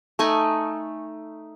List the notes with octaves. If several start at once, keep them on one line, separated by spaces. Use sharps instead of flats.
A3 D#4 G#5 C#6